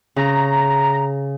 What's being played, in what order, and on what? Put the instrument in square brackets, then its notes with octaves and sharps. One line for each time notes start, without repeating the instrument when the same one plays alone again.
[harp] C#3 [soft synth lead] A#5